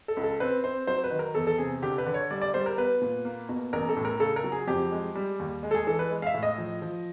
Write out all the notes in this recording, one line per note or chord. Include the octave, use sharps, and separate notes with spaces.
A4
C#2
A4
C4 B4
C4 C5
F#3 C5
B4
D#3
A#4
E2 A4
A4
C3 G#4
D3 G4
B4
D3
C#5
G3 D5
D5
G3 C5
A#4
B3 B4
A#2
A#3
B2
A1 A#4
A4
A2
A#4
C#3 A4
A#4
F#3
G#4
F2 G4
G#3
G3
D#2
G#3
A4
G#4
E3 A4
B4
G#3
F5
E5
A2
D#5
F3
F3